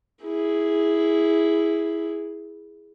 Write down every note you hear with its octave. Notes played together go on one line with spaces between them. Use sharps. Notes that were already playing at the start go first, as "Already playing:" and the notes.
E4 G#4